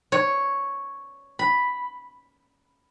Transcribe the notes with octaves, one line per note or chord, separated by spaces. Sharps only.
C#5
B5